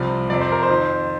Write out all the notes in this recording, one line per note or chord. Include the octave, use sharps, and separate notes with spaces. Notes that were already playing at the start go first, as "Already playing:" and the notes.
Already playing: C2 C3 F3 D5
F2 C3 F3 D5
C5
A#4
C5
F2 D#3